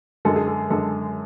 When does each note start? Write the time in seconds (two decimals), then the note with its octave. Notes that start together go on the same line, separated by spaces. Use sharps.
0.25 F#2 D3 G#3 A4
0.36 G#4
0.48 A4
0.70 F#2 D3 G#3 A4